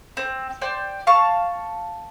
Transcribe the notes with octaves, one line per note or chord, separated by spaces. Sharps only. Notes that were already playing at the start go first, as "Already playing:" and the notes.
C4
C5 D5 G5
F5 A5 C#6